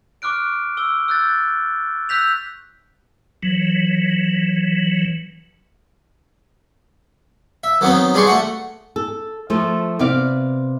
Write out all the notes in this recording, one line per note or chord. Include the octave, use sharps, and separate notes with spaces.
C#6 D6 F6 F#6 D7
C#6 E6 G7
E6 F#6 G6 A6
E6 F#6 G6 B6 F7
E3 F#3
E5
D#3 F#3 B3 C4 D#4
G3 D4 G#4 C6 C#6
A3 F#4 F#5
A4
F3 A3 A4 C5
C3 B3 D5 F5